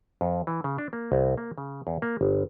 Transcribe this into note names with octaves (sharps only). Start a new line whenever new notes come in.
F2
E3
C#3
D4
A#3
C2
A#3
C#3
E2
A#3
G1